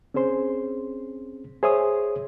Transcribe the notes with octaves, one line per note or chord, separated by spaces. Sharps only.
C4 C#4 G#4 C5 C6
G#4 C5 C#5 E5 C6 D#6